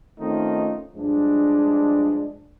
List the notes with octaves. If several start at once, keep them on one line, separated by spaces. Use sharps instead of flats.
D#3 A3 C4 C#4 D#4 F4
G2 F3 G#3 D4